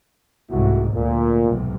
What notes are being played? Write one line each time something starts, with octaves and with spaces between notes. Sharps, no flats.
C2 G#2 A3 E4 F#4
D2 A#2
B1 G#2 C3